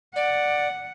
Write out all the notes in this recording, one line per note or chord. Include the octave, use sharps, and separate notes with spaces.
D5 F#5